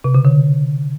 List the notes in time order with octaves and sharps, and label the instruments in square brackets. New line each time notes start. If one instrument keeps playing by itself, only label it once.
[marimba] C3
C#3
D3